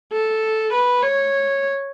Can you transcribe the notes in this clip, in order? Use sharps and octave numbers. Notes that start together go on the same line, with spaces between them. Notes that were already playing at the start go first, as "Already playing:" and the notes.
A4
B4
C#5